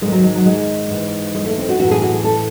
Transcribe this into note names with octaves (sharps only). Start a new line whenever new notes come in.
G#2 D#3 G#3
F#3
G#3
F#3
G#3
G#2 E3
G#3
A3
C4
F#4
A2 E3 F#4
G#4
F#4
G#4
A4